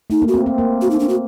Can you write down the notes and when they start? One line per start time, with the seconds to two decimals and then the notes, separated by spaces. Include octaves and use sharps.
0.10 A3 D#4
0.22 A#3
0.28 F#4
0.34 C4
0.46 C4
0.58 A#3
0.82 F#4
0.91 D#4
1.00 D4
1.09 F#4